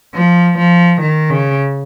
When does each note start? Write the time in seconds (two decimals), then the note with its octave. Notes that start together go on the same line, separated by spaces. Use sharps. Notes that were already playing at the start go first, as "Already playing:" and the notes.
0.15 F3
0.59 F3
1.01 D#3
1.30 C#3